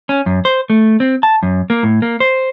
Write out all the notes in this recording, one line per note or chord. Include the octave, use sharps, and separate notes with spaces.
C#4
F#2
C5
A3
C4
A5
F#2
A#3
A2
A#3
C5